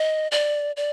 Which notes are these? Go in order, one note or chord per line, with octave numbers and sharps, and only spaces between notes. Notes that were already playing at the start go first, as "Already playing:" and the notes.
Already playing: D#5
D5
D5